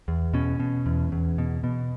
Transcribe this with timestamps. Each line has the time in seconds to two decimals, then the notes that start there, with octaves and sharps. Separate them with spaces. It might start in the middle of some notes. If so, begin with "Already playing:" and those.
0.08 E2
0.34 B2 C#4
0.60 B2
0.86 E2
1.12 E2
1.38 B2
1.64 B2